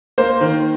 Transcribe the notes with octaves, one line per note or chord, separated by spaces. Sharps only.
A#3 C5
D#3